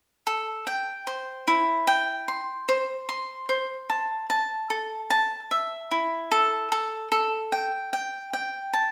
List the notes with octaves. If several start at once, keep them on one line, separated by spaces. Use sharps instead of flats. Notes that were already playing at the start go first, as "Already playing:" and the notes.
A4
G5
C5
E4
G5
C6
C5
C6
C5
A5
A5
A4
A5
E5
E4
A4
A4
A4
G5
G5
G5
A5